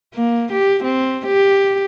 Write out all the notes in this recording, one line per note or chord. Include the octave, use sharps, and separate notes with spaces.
A#3
G4
C4
G4